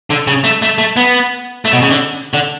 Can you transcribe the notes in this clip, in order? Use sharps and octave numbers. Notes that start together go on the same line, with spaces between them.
D3
C#3
A3
A3
A3
B3
A3
B2
C#3
D3
D3